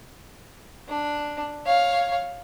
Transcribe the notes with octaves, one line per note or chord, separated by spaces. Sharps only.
D4
C#5 F5